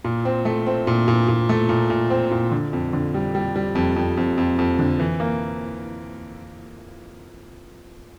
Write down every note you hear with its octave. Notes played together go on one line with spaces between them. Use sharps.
A#2
C4
A3
C4
A#2
A#2
A#2
A3
A#2
A#2
C4
A#2
D3
F2
D3
G3
G3
G3
F2
F2
F2
F2
F2
D3
E3
A#3